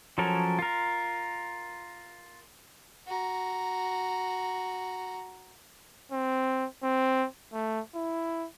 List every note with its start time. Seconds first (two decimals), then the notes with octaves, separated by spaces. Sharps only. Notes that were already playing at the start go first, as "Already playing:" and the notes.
0.18 F3 F#3 C#4 A4 A#4
0.59 F4 A#4
3.06 F#4 A#5
6.12 C4
6.83 C4
7.53 A3
7.95 E4